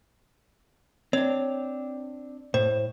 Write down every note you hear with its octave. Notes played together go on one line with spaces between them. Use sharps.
C4 D4 C#5
A2 C5